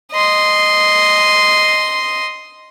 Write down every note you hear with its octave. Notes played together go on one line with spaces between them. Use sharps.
D#5 C6